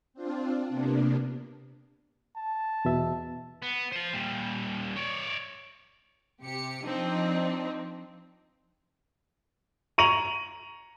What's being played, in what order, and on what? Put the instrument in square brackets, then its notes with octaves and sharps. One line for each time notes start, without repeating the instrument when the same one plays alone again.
[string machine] C4 D4 F4
C3 A#3 B3 D4
[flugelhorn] A5
[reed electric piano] E2 B2 E5
[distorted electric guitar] B3
C5 F5
A#2 G3
C#5 D5
[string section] C3 G4 C#7
F3 C4 D4 D#4
[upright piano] A#5 C#6 D#7 F7 F#7